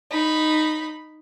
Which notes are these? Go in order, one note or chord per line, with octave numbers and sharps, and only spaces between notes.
D#4 B5